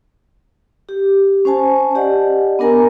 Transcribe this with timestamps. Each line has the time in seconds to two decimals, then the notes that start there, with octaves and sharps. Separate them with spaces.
0.89 G4
1.45 C#4 C5 G#5 A5
1.95 G4 D5 D#5 F#5
2.59 B3 D4 A#4 G#5 A#5